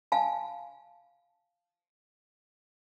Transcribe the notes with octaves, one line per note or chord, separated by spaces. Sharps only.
F5 G#5 A5